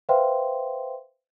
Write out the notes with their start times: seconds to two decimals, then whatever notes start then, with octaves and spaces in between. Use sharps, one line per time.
0.09 B4 C5 E5 F5 G5 C6